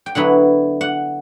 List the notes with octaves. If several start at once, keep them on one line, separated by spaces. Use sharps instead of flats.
G5
D3 F#3 B3 E4 F#5
F#5